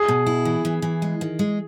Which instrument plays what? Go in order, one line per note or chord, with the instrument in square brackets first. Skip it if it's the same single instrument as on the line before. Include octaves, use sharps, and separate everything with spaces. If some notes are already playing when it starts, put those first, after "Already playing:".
Already playing: [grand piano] G#4
[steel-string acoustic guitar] B2
E4
E3
E3
E3
G#3
D#3
G#3